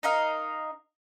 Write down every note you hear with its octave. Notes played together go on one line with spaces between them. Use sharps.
D#4 A#4 D#5 F5